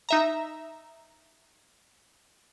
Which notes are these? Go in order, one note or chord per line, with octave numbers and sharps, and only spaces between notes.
D#4 E5 A#5